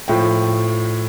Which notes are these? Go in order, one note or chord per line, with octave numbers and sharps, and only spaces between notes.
A2 F3 G5